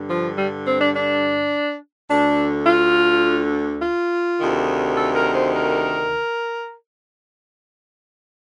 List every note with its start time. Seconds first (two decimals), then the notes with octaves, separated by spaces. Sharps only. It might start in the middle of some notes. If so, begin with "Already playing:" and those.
Already playing: G2 D3
0.09 F3
0.37 G3
0.67 C4
0.81 D4
0.95 D4
2.10 D2 D3 D4
2.67 F4
3.82 F4
4.39 D2 C3 D#3
4.96 A4
5.16 A#4
5.35 C5
5.54 A#4